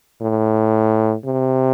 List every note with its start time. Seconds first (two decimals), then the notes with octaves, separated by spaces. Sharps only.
0.21 A2
1.25 C3